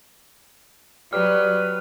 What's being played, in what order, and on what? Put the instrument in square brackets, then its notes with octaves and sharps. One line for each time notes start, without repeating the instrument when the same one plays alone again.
[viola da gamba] F#3 [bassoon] G3 [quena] B4 [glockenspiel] F6